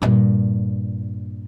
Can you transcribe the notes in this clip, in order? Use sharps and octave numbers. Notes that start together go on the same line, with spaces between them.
G2 A#2